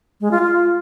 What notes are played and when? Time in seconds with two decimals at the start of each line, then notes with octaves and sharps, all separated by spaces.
0.21 G#3
0.31 F4
0.42 F4